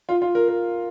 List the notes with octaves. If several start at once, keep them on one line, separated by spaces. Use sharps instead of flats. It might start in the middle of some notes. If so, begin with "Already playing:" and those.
F4
F4
A#4
A#4